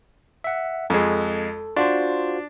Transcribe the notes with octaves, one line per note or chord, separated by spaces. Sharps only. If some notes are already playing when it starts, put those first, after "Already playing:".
E5 F#5
F2 G#3 A4
D4 F4 F#4 C5